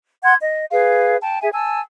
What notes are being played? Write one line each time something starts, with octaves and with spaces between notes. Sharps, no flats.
F#5 C6 G#6
D#5
G#4 B4 F5
G5 A5
G#4 E5 G#5
G#5 A5 E6